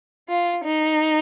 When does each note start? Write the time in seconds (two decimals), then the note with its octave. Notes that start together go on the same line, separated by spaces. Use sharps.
0.29 F4
0.64 D#4